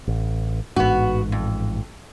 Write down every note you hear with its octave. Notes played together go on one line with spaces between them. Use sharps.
A1
A1 G#2 B3 F#4
F2